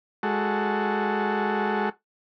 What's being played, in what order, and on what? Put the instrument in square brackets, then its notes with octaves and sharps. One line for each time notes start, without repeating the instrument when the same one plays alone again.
[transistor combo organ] G#3 F#4 A4